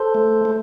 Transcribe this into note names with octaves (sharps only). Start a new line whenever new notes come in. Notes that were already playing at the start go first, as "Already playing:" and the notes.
Already playing: A4 C5
A3
A3